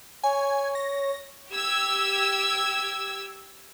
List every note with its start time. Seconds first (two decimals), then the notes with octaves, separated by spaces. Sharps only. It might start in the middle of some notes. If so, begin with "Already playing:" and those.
0.23 C#5 G#5
0.75 A#6
1.51 G4 E6 G#6